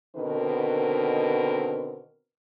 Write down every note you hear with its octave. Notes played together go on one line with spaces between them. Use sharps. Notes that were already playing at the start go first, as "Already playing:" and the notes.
B2 D3 D#3 C4 A#4 B4